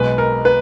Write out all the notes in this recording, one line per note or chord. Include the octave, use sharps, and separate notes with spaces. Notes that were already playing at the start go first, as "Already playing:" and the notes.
Already playing: B1 B2 G#3 B4
A#4
B4